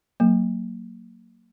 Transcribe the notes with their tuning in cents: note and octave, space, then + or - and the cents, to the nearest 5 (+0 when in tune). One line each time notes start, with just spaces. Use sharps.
F#3 +10 A#3 -15